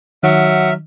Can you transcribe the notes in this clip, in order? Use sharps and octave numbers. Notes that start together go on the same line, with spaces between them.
D#3 F#3 E5 F#5 F6